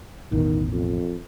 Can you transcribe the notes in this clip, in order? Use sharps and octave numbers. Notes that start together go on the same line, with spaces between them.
A1 E2 B2 D#3
F2